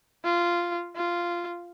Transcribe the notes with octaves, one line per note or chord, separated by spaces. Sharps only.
F4
F4